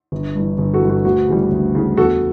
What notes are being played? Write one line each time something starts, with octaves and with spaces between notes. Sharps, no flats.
G1
G2 E3
G1
F#4 A4
G2 E3
F#4
D2 F#4
C#3 E3 G3
D2
C#3 E3 G3
E2 F#4 A4